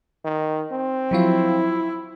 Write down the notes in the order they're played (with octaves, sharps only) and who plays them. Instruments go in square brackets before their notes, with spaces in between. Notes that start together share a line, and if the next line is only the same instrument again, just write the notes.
[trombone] D#3
C4
[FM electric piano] F3 F#3 F4 [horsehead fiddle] E4